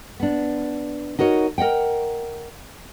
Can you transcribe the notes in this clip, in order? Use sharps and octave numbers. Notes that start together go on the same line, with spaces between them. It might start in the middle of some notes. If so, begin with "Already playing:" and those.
B3 D4
D#4 F#4 A#4 C#5 D#5
A#4 D#5 F#5 G5